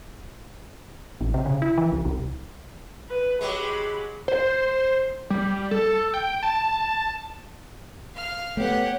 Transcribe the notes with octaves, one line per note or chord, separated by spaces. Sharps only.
A1
C3
C#3
E4
E3
C2
C2
B4
F#3 G#3 G4 B5
C5
G3
A4
G5
A5
F5 F6
A3 B3 G4 C#5 F#5